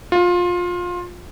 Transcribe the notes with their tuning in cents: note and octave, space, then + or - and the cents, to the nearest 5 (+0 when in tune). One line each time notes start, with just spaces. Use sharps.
F4 +20